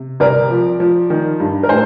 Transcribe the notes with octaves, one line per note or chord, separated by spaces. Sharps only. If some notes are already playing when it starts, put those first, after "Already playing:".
Already playing: C3
C2 A#4 D5
F3
F3
D#3
G2
A#4
A2 C5